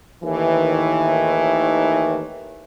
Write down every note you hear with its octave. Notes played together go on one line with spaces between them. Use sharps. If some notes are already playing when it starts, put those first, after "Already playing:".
D#2 A2 D#3 E3